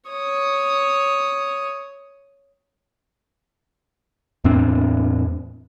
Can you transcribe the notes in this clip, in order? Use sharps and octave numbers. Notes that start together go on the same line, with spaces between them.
C#5 D#6
E2 A2 C4 D4